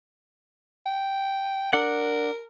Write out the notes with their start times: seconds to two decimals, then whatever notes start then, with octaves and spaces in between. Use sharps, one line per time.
0.86 G5
1.73 D4 A#4 F#5